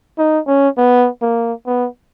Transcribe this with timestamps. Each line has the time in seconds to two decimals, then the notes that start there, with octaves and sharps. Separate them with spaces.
0.19 D#4
0.48 C#4
0.77 B3
1.22 A#3
1.67 B3